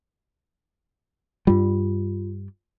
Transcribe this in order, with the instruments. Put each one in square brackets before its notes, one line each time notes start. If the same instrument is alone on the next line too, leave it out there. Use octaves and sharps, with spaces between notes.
[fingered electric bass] G2 G3 [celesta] F4